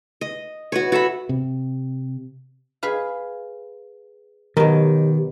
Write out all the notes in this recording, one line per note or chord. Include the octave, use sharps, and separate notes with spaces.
D#5
F#4 B4 C#5
F#4 A4 E5 B5
C3
G#4 B4 F5
B2 D#3 F#3 G4 A#4